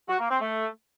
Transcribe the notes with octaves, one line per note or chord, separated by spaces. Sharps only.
F#4
A#3
C4
A3